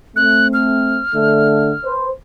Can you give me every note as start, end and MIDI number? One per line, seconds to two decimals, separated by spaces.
0.16 1.00 57
0.16 1.00 60
0.16 0.48 90
0.53 1.91 89
1.15 1.72 50
1.15 1.72 57
1.85 2.07 71
1.85 2.07 72